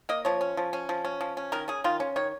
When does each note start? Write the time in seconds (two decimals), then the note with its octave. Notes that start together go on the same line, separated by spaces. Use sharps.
0.09 A#3 D#5
0.25 F3 C#5
0.41 C#4
0.57 F3
0.73 C#4
0.89 F3
1.04 C#4
1.21 F3
1.37 C#4
1.52 D#3 A#4
1.68 C#4 G#4
1.84 D#3 F4
2.00 C#4
2.16 D#3 C#5